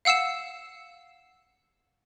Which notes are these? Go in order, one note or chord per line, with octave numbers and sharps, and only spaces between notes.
F5 F#5 E6 C7 E7